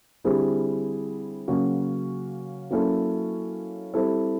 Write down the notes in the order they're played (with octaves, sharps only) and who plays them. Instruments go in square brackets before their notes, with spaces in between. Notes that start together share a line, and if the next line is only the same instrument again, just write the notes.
[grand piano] D3 G3 C4 E4 G#4
C#3 F#3 A#3 C#4 F#4
F#3 A#3 C#4 E4 A4
G3 C4 E4 A4